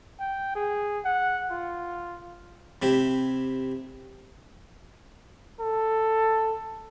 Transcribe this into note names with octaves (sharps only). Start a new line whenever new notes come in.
G5
G#4
F#5
F4
C3 E4 G4
A4